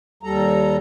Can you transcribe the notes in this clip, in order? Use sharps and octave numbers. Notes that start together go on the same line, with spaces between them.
D#2 G3 A4 A#5